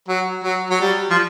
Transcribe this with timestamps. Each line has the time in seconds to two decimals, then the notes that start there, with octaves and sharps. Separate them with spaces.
0.08 F#3
0.44 F#3
0.70 F#3
0.81 G3
1.10 F3